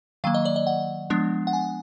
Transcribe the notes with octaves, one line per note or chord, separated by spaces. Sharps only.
D#3 F#3 A#3 F5
D#5
D5
D#5
F#5
F3 G#3 B3 D4
F#5
G#5